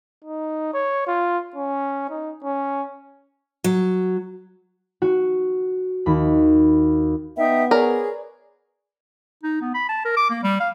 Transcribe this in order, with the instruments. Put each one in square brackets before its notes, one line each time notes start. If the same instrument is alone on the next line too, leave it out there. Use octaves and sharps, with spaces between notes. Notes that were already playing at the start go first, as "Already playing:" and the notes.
[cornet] D#4
C#5
F4
C#4
D#4
C#4
[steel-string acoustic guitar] F#3
[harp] F#4
D#2 B5
[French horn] B3 [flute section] D#4 E5 G5
[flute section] G#4 [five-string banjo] A#4 [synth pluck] B4 C#5 D5
[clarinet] D#4
B3
B5
A5
A#4
D6
A#3
G3
F5